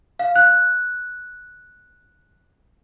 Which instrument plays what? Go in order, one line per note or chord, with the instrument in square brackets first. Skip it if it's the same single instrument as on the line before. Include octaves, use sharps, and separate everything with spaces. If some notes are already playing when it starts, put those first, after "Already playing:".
[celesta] F5
F#6